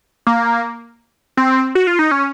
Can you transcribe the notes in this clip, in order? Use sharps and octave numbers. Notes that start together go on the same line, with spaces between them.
A#3
C4
F#4
F4
D#4
C#4